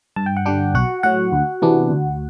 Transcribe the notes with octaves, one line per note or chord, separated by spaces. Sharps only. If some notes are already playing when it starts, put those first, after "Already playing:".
G2 A5
G5
F#5
D3 G3 D4 G4 G5
B1 F#4 F#5
A2 F#3 F#4 F#5
D2
C3 E3 B3 D4
D2